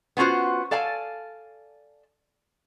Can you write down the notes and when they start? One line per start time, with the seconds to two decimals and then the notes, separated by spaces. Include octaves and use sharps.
0.17 B3 C#4 F4 F#4 C5
0.71 A4 D5 F5 G#5 A5